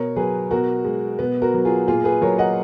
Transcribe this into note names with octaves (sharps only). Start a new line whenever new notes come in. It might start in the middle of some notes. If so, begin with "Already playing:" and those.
Already playing: B2 A#4 C#5
F#3 G#4 B4
B2 F#4 A#4
G#3
B2 B3
F#4 A#4
F#3
F4 G#4
A#2 F4 G#4
G#4 B4
F#3 A#4 C#5
D#5 F#5